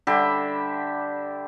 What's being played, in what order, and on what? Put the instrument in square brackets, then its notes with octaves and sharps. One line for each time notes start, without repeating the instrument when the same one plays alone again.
[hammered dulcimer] D3 G3 G4 E5